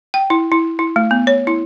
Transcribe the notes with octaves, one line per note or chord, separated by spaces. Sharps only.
G5
E4
E4
E4
A3
B3
C#5
E4